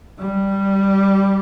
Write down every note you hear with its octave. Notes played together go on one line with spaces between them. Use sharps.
G3